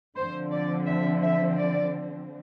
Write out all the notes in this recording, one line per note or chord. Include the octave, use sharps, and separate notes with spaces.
D3 F3 C4 C5
D5
E5
E5
D5